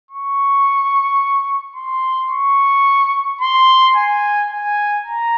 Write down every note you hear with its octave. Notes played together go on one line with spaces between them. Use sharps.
C#6
C6
C#6
C6
G#5
G#5
A#5